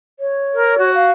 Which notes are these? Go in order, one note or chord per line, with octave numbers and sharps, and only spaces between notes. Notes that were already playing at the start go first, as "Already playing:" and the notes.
C#5
A#4
F#4
F5